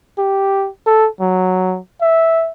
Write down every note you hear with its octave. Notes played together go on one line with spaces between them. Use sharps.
G4
A4
F#3
E5